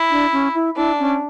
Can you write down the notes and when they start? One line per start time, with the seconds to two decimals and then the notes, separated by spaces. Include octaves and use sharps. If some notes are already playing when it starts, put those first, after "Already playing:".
Already playing: E4
0.11 D4
0.32 C#4
0.55 E4
0.76 D4 E4
0.99 C#4